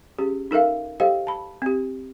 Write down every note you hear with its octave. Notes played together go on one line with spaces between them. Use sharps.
C#4 G4 G#4
D#4 A4 A#4 E5 F5
G4 A4 C5 D#5 F5 G5
A5 B5
C4 G4